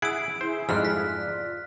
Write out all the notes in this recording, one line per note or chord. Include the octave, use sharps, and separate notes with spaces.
E4 G#4 F#5 E6 D7
E4 G#4 C5
F2 G#2 G3 F6 F#6
B6
F4 D5